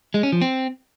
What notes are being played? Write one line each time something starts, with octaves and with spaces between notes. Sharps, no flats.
G#3
C#4
F3
C4